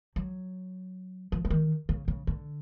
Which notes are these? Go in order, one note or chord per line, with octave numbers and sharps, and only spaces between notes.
F#3
F3
E3
D#3
C#3
C#3
D3